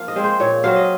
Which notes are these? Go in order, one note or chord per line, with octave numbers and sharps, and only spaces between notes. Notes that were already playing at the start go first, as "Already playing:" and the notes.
Already playing: F3 A#3 F5
D#5
G#3 C4
C5
A#2 C#5
F#3 C4 F5
D#5